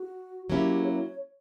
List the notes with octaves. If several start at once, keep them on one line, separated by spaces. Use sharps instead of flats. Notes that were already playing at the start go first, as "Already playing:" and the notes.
Already playing: F#4
F#3 A#3 C#4 E4 G4
C#5